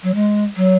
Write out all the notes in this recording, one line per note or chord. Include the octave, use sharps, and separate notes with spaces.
F#3
G#3
F#3